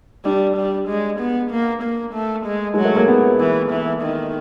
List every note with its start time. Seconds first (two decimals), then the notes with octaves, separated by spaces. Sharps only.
0.25 G3 D4
0.56 G3
0.88 G#3
1.19 B3
1.50 A#3
1.82 A#3
2.14 A3
2.45 G#3
2.74 F#3 G#3
2.85 A3
2.96 A#3
3.08 B3
3.40 E3
3.71 E3
4.02 D#3